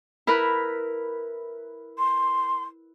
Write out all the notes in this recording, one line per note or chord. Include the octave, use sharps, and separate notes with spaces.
E4 A#4 B4
C6